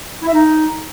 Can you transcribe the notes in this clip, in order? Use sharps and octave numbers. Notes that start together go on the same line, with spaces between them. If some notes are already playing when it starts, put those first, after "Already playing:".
E4
E5
D#4